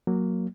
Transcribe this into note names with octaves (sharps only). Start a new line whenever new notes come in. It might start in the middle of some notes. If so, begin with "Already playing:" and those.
F#3 A#3